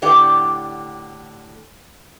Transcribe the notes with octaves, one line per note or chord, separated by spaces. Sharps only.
A2 D3 G4 D5 F#5